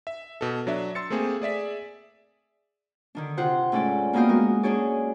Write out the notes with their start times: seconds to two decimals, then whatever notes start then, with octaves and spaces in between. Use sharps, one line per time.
0.07 E5
0.41 B2 A4
0.67 F#3 D4 E5
0.95 C6 E6 A6 C#7
1.10 A3 A#3 C4 G#4
1.42 G#4 D5 E5 B6
3.15 D3 D#3 D4
3.37 C3 F4 C5 F#5
3.72 G#2 A3 C#4 A4 D5
4.13 A#3 B3 F#4 D#5 F5 G5
4.29 G#3 F#4 A#4
4.63 C#4 D4 G#4 C#5 D5